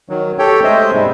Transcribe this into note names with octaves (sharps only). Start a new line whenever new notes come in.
D#3 F#3
G4 A4 C#5 G5
G#3 A3 C5 D#5 E5
G#2 C3 G3 G#3